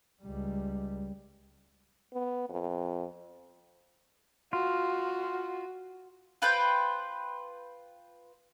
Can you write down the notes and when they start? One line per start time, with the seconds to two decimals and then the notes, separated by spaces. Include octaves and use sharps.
0.22 C#2 G3
2.13 B3
2.49 F2
4.53 F4 F#4
6.42 F4 B4 C5 G5